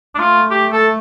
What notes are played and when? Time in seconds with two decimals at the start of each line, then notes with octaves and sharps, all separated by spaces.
0.15 D4
0.19 A3 F4
0.50 G4
0.72 A4